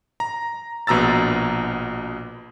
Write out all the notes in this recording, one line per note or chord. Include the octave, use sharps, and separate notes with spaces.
A#5
A#1 B2 A#5 E6 A6